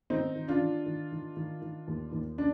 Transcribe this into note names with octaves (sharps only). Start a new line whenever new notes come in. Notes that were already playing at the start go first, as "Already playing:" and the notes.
D#3 C4 D#4
D#3
D4 F4
D#3
D#3
D#3
D#3
D#3
D#2
D#2
D4